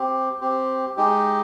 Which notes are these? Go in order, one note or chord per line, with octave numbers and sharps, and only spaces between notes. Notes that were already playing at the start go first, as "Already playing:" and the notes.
Already playing: C4 G4
C4 G4
G#3 D#4 G4